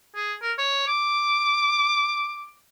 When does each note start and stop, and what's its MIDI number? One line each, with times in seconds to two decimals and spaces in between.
0.15 0.34 68
0.42 0.52 70
0.58 0.84 73
0.87 2.55 86